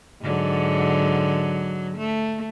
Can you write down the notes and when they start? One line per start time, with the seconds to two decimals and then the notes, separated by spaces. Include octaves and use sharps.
0.22 G#2 D3 F#3
1.97 A3